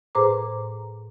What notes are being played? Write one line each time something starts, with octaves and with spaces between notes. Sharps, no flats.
A2 G#4 B4 C5 A#5 D6